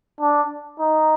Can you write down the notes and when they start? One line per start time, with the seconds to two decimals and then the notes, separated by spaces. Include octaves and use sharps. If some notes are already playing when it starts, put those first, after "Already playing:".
0.21 D4
0.80 D#4